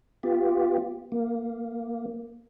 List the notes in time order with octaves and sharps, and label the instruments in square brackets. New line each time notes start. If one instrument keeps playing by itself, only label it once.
[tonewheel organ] B3 F4 G4
A#3